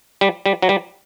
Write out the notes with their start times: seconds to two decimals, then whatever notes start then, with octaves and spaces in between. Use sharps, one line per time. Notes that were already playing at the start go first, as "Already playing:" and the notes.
0.21 G3
0.46 G3
0.62 F#3
0.69 G3